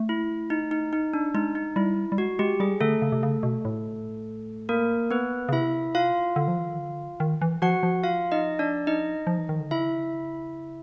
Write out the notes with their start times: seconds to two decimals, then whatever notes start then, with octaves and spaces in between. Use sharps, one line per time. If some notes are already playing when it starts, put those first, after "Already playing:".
Already playing: A3
0.09 E4
0.50 D#4
0.71 D#4
0.93 D#4
1.13 D4
1.34 G#3 D#4
1.55 D#4
1.76 G3 E4
2.12 G3
2.18 G#3 F#4
2.39 G#3 G4
2.60 G3 G#4
2.80 D3 A3 A4
3.02 C#3
3.12 C3
3.23 C#3
3.43 B2
3.65 A2
4.69 A#3 A#4
5.11 B3 B4
5.49 C#3
5.53 C3 E4 E5
5.95 F4 F5
6.36 D3
6.48 F3
6.58 E3
6.68 D#3
6.78 D3
7.20 D#3
7.42 E3
7.62 F3 F#4 F#5
7.83 F3
8.03 F4 F5
8.32 D#4 D#5
8.59 D4 D5
8.87 D#4 D#5
9.27 F3
9.38 E3
9.49 D#3
9.60 D3
9.71 C#3 E4 E5